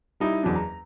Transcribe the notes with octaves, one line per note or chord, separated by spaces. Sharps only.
G3 D#4 E4
F#1 E2 F#3 D4
A#5